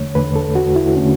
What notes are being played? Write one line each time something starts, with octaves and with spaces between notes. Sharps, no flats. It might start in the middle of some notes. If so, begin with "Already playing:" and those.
Already playing: E2 D3 A3 C#5
E2 D3 A3 B4
A4
F#4
E4
D3 A3 C#4